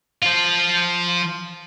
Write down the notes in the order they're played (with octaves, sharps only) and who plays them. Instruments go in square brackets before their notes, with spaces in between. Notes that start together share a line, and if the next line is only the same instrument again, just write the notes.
[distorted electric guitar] F3 F4